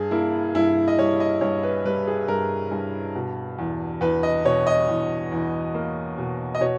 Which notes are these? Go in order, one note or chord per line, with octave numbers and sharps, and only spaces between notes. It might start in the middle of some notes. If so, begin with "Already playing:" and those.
Already playing: G2 G#4
A#3 E4
G2 E4
D#5
G3 C#5
D#5
G2 C#5
B4
G3 B4
G#4
G2 A#4
G2
B2
E2
E2 B4
D#5
B2 C#5
D#5
E2
E2
A#3
B2
D#5
B2 C#5